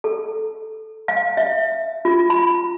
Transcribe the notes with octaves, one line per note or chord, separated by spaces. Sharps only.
A4
F5
E5
F4
B5